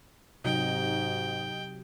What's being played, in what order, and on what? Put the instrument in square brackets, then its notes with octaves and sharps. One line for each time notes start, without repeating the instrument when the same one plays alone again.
[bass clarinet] G#2 [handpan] C3 F#3 [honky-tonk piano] D#4 [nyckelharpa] G5